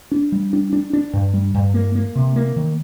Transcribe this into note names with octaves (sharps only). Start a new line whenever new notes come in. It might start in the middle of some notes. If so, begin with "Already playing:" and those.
D4
G3
D4
D4
D4
G2
G3
G2
A#3
A#3
C3
A#3
D#3